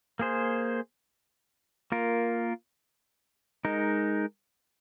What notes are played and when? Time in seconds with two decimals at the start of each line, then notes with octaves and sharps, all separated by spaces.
0.19 A#3 G#4 C5
1.92 A#3 F4 A#4
3.65 G#3 D#4 A#4